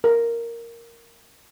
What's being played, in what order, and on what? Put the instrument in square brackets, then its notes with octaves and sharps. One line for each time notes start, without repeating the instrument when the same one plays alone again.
[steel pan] A#4